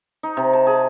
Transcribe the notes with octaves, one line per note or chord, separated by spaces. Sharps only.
D#4
C3
A5
G#4